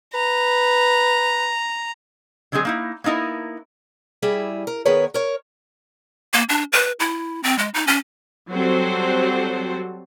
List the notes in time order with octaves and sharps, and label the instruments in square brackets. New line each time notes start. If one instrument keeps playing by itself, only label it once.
[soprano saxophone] B4 [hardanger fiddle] A#5
[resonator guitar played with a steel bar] D3 F#3 G#3 C4 G#4
A#3 D#4 E4
A#3 B3 D#4 E4 A#4
[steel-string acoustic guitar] G3 E4 G4 G#4 E5
A#4
D#3 B3 G#4 A#4 B4 C#5
A#4 C#5
[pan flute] A#3
D4
B4
E4
C4
G#3
D#4
C#4
[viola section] F#3 G3 C4 F#4 A4 C5